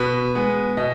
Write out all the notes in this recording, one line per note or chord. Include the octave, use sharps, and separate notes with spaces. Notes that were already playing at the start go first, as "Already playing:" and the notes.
Already playing: B2 B4
G#3 B3
B2 D#5